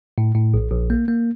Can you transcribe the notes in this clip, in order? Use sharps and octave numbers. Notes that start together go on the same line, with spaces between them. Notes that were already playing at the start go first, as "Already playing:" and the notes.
A2
A2
A#1
A#1
A#3
A#3